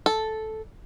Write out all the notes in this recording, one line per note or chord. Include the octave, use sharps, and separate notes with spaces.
A4